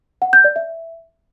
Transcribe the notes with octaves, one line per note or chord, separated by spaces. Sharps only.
F#5
G6
D5
E5